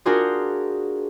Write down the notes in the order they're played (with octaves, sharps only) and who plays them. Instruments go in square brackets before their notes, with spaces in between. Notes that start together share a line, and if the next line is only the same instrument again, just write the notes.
[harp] D4 F4 F#4 G#4 A#4 C5